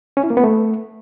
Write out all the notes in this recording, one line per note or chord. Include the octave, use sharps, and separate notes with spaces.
C#4
E4
A#3
B3
A3